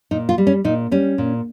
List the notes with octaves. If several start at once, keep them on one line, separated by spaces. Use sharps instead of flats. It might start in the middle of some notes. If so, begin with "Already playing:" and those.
A#2 D#4
F4
G3
C#4
A#2 D#4
G3 C#4
A#2